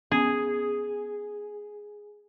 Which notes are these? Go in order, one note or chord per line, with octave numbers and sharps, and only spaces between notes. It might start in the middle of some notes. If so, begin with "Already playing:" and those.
B3 C#4 G#4